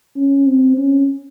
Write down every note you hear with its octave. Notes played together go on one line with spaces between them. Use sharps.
C#4
C4
C#4